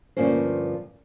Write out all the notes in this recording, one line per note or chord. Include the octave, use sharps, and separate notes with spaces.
D2 G2 F3 A#3 C#4 C5